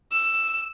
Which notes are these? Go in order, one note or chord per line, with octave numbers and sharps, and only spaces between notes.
E6